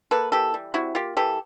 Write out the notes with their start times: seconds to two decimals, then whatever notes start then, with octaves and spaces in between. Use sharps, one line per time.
0.11 A#3 A4 B4
0.32 E3 G4 A4
0.54 G3
0.74 C3 E4 F#4
0.95 A#3 F4 G4
1.17 E3 G4 A4